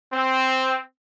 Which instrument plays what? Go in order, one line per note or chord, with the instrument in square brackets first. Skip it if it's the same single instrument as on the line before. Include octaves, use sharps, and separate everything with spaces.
[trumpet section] C4